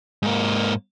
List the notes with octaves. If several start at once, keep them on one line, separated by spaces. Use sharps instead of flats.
G#2 A#3